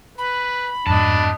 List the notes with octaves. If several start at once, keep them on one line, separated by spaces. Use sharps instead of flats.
B4 B5
F2 G#2 D4 D#5 A5